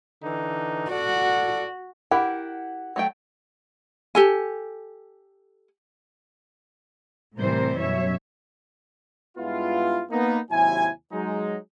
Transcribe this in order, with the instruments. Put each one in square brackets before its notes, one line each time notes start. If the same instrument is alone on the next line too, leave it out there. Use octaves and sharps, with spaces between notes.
[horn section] D3 E3 D#4
[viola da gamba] F#4 [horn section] A4 D5 F#5
[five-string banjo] E4 G4 A#4 [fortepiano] F#5
[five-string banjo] F#3 A3 G5
[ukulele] G4 A4 G#5
[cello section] A2 C3 E3 G3 A#4 C5
F#2 B2 C#5 E5
[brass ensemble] G2 G#3 B3 E4 F4
A#3 B3 D#4
D#2 C3 F#3 E4 G#5
F#3 G#3 D#4